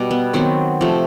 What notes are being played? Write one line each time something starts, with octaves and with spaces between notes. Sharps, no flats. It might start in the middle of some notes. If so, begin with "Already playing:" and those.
Already playing: B2 G3
B3
D#3 F#3 B3 C4
C3 F3 A3